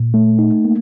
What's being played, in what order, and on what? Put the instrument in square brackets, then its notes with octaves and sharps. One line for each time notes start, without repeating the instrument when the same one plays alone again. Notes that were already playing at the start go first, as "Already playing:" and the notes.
Already playing: [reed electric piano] A#2
A3
D#4
A#3